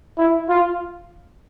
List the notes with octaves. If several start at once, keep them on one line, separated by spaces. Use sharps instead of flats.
E4
F4